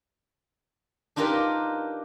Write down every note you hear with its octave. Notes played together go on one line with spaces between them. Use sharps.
D4 D#4 F4 G4 A#4 B4